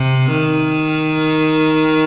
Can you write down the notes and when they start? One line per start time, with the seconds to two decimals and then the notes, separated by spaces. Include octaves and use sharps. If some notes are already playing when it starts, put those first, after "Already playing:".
Already playing: C3
0.31 D#3